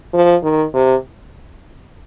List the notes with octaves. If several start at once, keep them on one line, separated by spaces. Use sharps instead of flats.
F3
D#3
C3